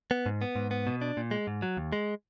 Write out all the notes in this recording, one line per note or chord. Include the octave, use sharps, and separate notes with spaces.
B3
G#2
B3
G#2
B3
B2
D4
A#2
G#3
G#2
F#3
D#2
G#3